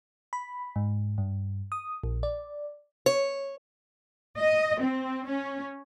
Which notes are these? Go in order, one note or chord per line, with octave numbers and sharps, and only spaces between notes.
B5
G#2
G2
D#6
A#1
D5
C#5
D#5
C4
C#4